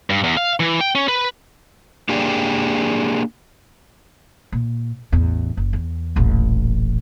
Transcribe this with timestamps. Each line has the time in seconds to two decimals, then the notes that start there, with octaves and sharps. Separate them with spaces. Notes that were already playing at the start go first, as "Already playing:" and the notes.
0.10 G2
0.24 E2
0.37 F5
0.60 E3
0.81 G5
0.95 C#4
1.08 B4
2.09 A#3 D4 G4 G#4 D5 G5
4.52 A#2
5.12 A1 E2
5.57 F#1
5.73 E2
6.16 D#1 A1